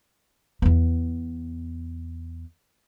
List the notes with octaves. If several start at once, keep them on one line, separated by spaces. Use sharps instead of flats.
E2 B3